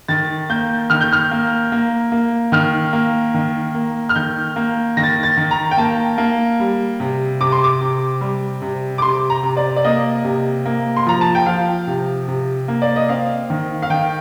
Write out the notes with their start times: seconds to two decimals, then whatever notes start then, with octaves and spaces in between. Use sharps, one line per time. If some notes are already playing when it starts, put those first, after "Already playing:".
0.09 D#3 A6
0.50 A#3 G6
0.90 D#3 F6
1.01 G6
1.12 F6
1.31 A#3
1.72 A#3
2.12 A#3
2.52 D#3 F6
2.93 A#3
3.34 D#3
3.74 A#3
4.09 F6
4.15 D#3 G6
4.56 A#3
4.97 D#3 A#6
5.03 A6
5.10 A#6
5.23 A6
5.37 D#3
5.51 A#5
5.71 G5
5.77 A#3 A5
6.18 A#3
6.60 G3
7.00 C3
7.40 C3 D6
7.52 C6
7.64 D6
7.81 C3
8.21 G3
8.62 C3
8.98 D6
9.02 C3 C6
9.30 A#5
9.43 C3
9.57 D5
9.76 D5
9.85 A#3 D#5
10.24 C3
10.66 A#3
10.96 C6
11.07 F3 A#5
11.21 A5
11.35 G5
11.46 F3 F5
11.87 C3
12.28 C3
12.68 A#3
12.82 D5
12.96 D#5
13.09 C4 F5
13.50 D#3
13.82 F5
13.90 D#3 G5